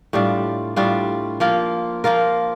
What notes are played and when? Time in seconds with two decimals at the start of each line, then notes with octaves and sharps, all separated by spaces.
0.13 A2 G3 D4 F4
0.76 A2 G3 D4 F4
1.40 F3 A#3 F4 A#4
2.04 F3 A#3 F4 A#4